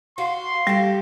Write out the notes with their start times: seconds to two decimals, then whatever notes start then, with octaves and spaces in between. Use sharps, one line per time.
0.18 F#4 F5 C6
0.67 G3 G4 A4